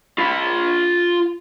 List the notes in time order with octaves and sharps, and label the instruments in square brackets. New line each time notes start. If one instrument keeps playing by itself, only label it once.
[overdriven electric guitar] F4 B5